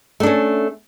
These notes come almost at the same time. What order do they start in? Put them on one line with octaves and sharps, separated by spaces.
A3 D4 C#4